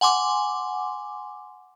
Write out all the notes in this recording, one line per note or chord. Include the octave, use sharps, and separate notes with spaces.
F#5 G#5 C6 D6